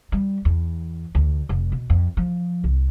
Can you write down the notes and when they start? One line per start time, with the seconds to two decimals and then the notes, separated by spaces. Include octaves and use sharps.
0.12 G3
0.45 E2
1.15 D2
1.49 F1
1.72 B2
1.90 F2
2.17 F3
2.64 C2